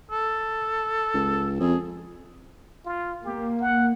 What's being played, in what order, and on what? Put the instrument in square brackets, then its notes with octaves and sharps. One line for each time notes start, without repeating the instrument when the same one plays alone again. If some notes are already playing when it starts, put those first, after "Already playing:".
[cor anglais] A4
[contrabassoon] C#2
[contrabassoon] F2 [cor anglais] G#4
[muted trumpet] F4
[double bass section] A#3 [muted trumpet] G4
[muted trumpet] F#5